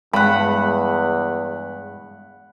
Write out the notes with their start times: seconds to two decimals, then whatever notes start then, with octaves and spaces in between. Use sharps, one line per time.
0.13 E2 G2 G#3 F#5 B5